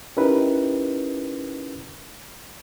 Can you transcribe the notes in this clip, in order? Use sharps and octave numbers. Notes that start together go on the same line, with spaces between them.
C#4 D#4 E4 G4 A#4 B4